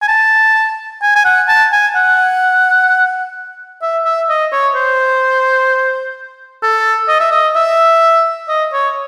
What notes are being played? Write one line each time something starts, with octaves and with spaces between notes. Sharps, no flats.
G#5
A5
G#5
G#5
F#5
A5
G#5
F#5
E5
E5
D#5
C#5
C5
A4
D#5
E5
D#5
E5
D#5
C#5